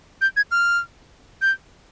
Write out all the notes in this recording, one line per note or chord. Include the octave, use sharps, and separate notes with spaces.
G6
G#6
F6
G6